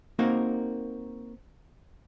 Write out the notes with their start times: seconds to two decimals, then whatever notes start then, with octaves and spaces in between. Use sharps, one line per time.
0.19 A#3 C4 D#4 F#4 A#4 F5